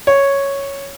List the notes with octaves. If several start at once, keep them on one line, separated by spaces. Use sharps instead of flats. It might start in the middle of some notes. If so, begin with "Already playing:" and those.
C#5